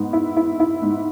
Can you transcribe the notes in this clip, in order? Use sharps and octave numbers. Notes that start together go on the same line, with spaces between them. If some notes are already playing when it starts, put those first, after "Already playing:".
Already playing: G#2 B3
E4
E4
E4
G#2